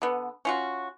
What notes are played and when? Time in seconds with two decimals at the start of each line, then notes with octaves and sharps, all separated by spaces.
0.02 D3 B3
0.45 C#4 F4 F#4